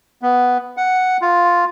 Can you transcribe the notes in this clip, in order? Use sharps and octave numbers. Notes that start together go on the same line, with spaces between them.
B3
F#5
F4